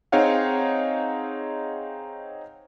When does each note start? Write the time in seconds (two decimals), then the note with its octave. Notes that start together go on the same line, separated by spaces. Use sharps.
0.12 C4 D#4 G#4 C#5 F5 F#5